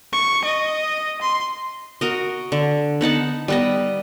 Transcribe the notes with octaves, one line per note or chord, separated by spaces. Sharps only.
C#6
D#5
C6
F#4 A#4 D#5
D3
B3 D#4 F#5 A5
G3 B3 D#5